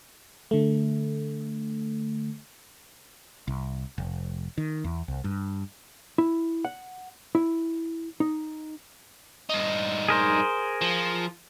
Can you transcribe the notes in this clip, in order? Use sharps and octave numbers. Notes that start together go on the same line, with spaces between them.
D3 A3
C2
F1
D#3
E2
C2
G2
E4
F#5
E4
D#4
G2 D#4
G#4 A#4 C5
F3